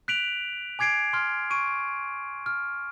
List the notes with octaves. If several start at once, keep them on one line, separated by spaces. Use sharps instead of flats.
F#6 B6 D7 F7 F#7
G#5 D6 G#6 C7 D7
C6 F6
C#6 D7 D#7
F6